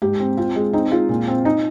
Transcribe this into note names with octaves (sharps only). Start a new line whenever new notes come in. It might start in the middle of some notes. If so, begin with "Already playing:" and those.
G#2 G4
C4
C4 F4
G#3
C4 D#4
G#3 F4
A#2
C4
D#4